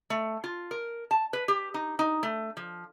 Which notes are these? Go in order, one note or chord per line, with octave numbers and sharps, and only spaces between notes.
A3
F4
A#4
A5
B4
G4
D#4
D#4
A3
F3